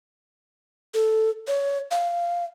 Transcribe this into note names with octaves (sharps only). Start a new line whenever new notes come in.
A4
C#5
F5